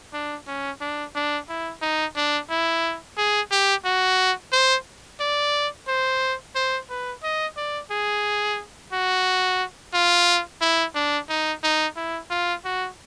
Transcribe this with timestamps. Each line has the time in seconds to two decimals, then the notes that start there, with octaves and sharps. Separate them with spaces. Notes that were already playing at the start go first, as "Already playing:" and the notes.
0.13 D4
0.47 C#4
0.81 D4
1.15 D4
1.49 E4
1.82 D#4
2.16 D4
2.50 E4
3.17 G#4
3.51 G4
3.85 F#4
4.52 C5
5.20 D5
5.88 C5
6.55 C5
6.89 B4
7.23 D#5
7.57 D5
7.91 G#4
8.92 F#4
9.94 F4
10.61 E4
10.95 D4
11.29 D#4
11.63 D#4
11.96 E4
12.30 F4
12.64 F#4